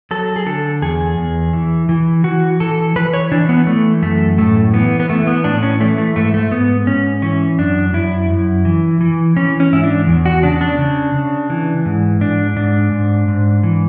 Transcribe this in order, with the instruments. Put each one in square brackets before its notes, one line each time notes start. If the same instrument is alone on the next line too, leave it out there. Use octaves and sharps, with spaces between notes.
[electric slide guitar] F#3 A4
G#4
D3 A4
E2 G#4
E2
E3
E3
E3 F#4
E3 A4
E3 B4
C#5
E3 D4
B3
E3 A3
F#2 A3
A2 A3
E3 B3
B3
E3 A3
B3
A2 D4
C#4
E3 A3
A3
G#2 A3
A3
G#2 B3
G#2 C#4
E3 C#4
F#2 D4
F#2 E4
F#2
E3
E3
E3 C#4
C#4
G#2 E4
D4
E2
F#4
C#3 D4
D4
C#3
C#3
E3
G#2
G#2 D4
G#2 D4
G#2
G#2
E3